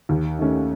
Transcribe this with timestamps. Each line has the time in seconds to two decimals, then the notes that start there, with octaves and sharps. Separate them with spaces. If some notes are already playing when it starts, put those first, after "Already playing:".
0.09 D#2
0.39 D#3 A3 C#4